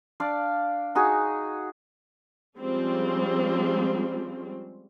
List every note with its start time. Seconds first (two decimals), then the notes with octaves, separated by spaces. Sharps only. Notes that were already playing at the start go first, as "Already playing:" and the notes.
0.20 D4 D5 F5
0.95 D#4 F#4 G#4
2.57 F3 G3 G#3 C4 C#4